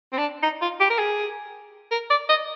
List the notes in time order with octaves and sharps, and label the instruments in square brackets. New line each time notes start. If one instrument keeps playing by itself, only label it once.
[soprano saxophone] C4
D4
D#4
F4
G4
A#4
G#4
A#4
D5
D#5